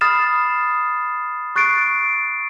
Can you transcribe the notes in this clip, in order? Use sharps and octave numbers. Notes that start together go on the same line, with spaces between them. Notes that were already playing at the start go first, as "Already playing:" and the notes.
B5 D#6 F6 A6 C7 E7
C#6 F#6 A6 C7 D7